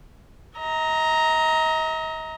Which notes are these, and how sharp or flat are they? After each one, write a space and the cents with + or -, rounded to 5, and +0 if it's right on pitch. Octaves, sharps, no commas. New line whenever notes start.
D#5 +40 A#5 +0